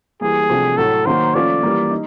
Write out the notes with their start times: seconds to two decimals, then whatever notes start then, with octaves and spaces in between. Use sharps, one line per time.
0.21 E3 G3 A#3 G#4
0.50 C3 F3 A3 D4 F#4
0.77 A2 F#3 A3 A4
1.06 D#3 F#3 A#3 C5
1.35 F3 A3 C#4 F4 D5
1.63 E3 G3 A#3
1.91 D#4